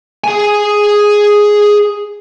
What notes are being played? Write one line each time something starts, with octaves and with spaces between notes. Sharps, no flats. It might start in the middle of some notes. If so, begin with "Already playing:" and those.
G#4 G#5